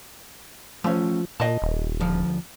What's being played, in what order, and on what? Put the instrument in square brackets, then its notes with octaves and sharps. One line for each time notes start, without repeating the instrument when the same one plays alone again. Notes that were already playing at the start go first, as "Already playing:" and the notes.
[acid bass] F3 [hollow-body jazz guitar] A3 C#4
[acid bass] A#2 [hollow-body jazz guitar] D#5 A5
[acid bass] D#1
[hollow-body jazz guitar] D2 F3